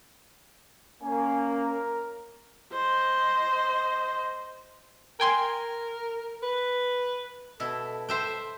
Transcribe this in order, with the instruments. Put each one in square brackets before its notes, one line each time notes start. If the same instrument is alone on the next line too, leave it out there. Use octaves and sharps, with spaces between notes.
[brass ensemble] A#3 C#4 [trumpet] G#5
[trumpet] A#4
[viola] C5 D#5
[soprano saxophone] A#4 [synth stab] G5 G#5 C6
[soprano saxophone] B4
[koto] B2 E4 [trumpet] A4
[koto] C5 E5 G5